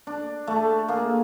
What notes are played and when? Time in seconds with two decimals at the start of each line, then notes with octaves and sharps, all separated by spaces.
0.07 D4
0.47 A3 A5
0.88 A#3 G#4